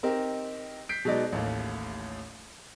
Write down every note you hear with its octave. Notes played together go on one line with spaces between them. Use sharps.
C4 D#4 G4 A#4
G6 B6 C7 D7
B2 F#3 G#3 D#4 D5
A1 D#2 A2